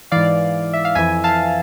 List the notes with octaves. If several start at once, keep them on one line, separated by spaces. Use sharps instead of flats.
G#2 E3 D5 F5
E5
F5
F2 E3 E5 G#5
F5 A5